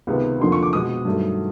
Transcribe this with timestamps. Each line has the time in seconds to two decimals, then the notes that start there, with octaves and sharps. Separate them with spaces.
0.07 C#2 C3 D#3 G#3 B3
0.40 F2 D3 F3 A#3 C6
0.52 C#6
0.63 D6
0.73 B2 G#3 B3 D#6
1.05 G2 D#3 F#3 A3